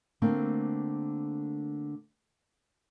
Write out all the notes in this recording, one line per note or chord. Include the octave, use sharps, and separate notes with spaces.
D3 A3 A#3 C4